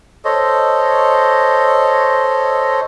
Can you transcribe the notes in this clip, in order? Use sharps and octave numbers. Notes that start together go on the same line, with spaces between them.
A4 C5 C#5 D#5